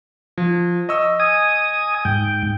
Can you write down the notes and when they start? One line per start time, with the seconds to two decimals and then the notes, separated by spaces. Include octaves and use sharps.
0.38 F3
0.89 D#5 C#6 E6
1.20 G#5 D#6
2.05 G#2 G5